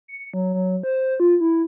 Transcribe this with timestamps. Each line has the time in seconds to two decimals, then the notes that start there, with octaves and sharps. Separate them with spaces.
0.08 C#7
0.34 F#3
0.54 F#3
0.83 C5
1.20 F4
1.41 E4